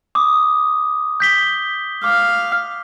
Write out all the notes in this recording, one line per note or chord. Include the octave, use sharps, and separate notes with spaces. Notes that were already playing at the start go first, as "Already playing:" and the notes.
D6 D#6
G6 B6 G7
F5 D6